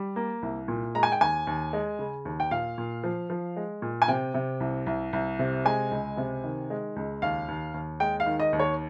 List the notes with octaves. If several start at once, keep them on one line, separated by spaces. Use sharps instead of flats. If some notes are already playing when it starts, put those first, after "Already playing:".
Already playing: G3
A#3
C2
A#2
G#3 A#5
G#5
G5
D#2 G#5
D#2
G#3
C#3
D#2
G5
A#2 F5
A#2
F3
F3
G#3
A#2
G#5
C3 G5
C3
C2
C2
C2
C3
G#3 G#5
C#2
C3
D#3
G#3
C#2
D#2 F5
D#2
D#2
G#3 G5
F5
D#3
D#5
D#2
C#5